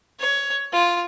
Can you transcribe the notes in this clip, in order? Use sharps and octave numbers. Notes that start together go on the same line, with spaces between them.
C#5
F4